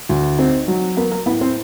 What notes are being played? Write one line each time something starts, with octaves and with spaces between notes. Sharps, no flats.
D2
C4 D#4 C5
F#3
A#3 B3 B4
A#3 A#4
A2 B3 B4
C4 C5